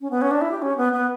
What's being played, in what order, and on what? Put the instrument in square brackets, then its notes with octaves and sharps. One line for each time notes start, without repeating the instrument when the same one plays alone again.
[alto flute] C#4
B3
C#4
D4
E4
G4
C#4
B3
B3